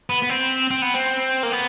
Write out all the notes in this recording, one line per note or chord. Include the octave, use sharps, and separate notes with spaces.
B3
B3
C4
C4
B3
C4
A#3
B3